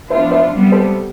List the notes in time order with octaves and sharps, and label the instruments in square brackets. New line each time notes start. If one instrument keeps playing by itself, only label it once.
[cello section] F3 B3 D4 F4 [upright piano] C5 E5
[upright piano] C5 E5
[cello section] C3 G3 B3
[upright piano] A4 C5